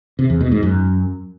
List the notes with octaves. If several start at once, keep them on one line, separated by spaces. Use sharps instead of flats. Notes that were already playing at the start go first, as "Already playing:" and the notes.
C3
E2
B2
G#2
F#2